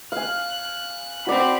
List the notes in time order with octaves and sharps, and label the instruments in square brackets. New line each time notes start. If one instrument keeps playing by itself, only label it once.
[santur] F5 G#5 [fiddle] F#6
[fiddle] C4 B5 [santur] F#4 D5